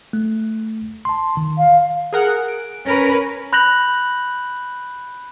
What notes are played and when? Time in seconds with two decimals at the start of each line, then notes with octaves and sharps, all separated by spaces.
0.13 A3
1.05 A5 C6
1.37 D#3
1.58 F5
2.13 G#4 A#4 F#5
2.48 D7
2.84 C#4 A#4 B4
3.53 B5 F#6 G6 A#6 F7 F#7